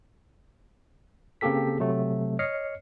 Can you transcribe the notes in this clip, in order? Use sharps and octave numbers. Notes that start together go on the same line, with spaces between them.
C#3 A#3 C4 G4 A4 B6
C3 F#3 A3
C#5 D#5 F6 C7 C#7